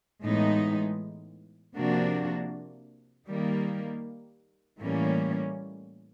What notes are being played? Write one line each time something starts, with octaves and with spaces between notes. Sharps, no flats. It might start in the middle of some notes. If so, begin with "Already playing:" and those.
A2 E3 G#3 B3 D#4
C3 F3 A#3 D4 F#4
D#3 G3 A#3
A2 E3 G3 A#3 C#4